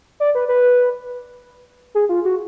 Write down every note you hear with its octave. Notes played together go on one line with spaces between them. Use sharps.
D5
B4
B4
G#4
F4
F#4